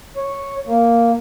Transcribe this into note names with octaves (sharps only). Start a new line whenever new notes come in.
C#5
A#3